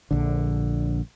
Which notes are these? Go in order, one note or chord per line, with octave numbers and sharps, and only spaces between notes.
A#1 D3